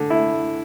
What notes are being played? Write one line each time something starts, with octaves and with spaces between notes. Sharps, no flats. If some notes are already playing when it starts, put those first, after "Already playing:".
Already playing: D3
E4